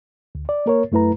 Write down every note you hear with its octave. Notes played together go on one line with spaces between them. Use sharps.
D2
D5
A#3 A#4 C#5
F#2 A3 E4 B4 A#5